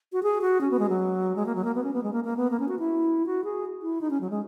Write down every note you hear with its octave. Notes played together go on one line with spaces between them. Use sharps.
F#4
G#4
F#4
C#4
B3
G#3
F#3
G#3
A#3
F#3
A#3
B3
C#4
B3
G#3
A#3
A#3
B3
A#3
C#4
F#4
E4
F#4
G#4
E4
D#4
C#4
F#3
G#3